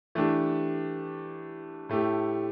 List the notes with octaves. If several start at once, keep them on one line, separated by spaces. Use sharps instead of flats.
E3 A3 D4 G4
A2 A3 G4